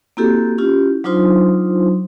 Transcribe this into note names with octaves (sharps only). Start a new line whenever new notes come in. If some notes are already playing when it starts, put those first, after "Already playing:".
A#3 C4 E4 F#4 G4 A4
C#4 E4 F4 G4
F#3 D4 D#4 F4 C5 C6